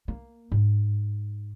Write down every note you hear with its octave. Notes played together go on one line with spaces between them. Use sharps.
A#3
G#2